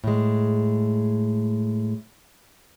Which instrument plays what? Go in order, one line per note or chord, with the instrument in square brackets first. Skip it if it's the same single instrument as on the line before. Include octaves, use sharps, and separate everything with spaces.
[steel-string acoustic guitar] A2 G#3